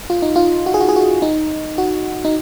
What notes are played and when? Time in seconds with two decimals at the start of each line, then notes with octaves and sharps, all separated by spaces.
0.10 F4
0.22 D#4
0.36 F4
0.66 F#4
0.74 G#4
0.80 F#4
0.89 G#4
0.96 F#4
1.22 D#4
1.78 F#4
2.25 D#4